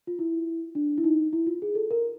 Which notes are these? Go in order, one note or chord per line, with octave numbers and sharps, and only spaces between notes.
F4
E4
D4
E4
D#4
E4
F4
G#4
A4
A#4